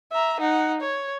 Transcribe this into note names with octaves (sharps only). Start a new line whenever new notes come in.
E5 A#5
D#4 F#5
C#5